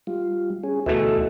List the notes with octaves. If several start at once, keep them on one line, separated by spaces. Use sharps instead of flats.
G3 F4
C#4 G#4
D2 B2 E3 A3 A4 E5